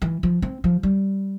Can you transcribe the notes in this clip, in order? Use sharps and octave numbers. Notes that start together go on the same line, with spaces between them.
E3
F3
C4
F3
G3